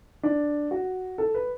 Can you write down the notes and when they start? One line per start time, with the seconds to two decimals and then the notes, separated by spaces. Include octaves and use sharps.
0.23 D4
0.71 F#4
1.18 A4
1.34 B4